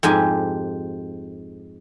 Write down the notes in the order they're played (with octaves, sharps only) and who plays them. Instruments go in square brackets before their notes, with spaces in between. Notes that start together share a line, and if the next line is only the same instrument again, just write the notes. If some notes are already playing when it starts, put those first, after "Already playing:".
[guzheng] F2 G#2 G4 G#5